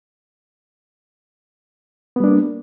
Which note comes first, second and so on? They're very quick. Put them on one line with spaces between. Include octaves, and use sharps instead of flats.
B3 G3 D4 A#3